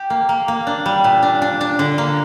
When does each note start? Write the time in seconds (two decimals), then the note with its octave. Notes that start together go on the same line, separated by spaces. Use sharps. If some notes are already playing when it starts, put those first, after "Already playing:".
Already playing: G4
0.10 A#3
0.29 A#3
0.48 A#3
0.67 D4
0.86 G3
1.04 A#2
1.22 D4
1.42 D4
1.61 D4
1.79 D3
1.98 A#3